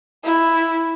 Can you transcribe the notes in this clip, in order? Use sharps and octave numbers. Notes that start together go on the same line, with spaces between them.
E4